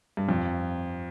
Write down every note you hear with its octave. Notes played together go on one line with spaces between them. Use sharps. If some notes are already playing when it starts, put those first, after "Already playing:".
G2
F2